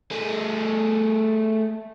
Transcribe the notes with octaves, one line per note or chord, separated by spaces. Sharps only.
A3 G#4